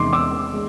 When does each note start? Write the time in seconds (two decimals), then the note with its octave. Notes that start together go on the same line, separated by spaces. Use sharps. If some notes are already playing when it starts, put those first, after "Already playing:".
Already playing: E2 C3 D#3 G#3 C6 D6
0.13 D6 E6
0.54 G#3